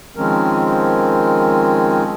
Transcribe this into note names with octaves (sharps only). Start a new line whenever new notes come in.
D#3 F3 G#3 C4 C#4 A#4